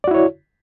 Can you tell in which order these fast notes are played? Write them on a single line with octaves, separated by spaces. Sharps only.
D5 F#4 E4 C#5